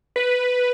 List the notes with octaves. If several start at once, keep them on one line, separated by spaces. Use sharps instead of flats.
B4